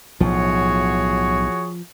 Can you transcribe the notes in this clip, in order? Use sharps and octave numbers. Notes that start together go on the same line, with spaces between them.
B1 A2 F3 F#4 G#4 C#5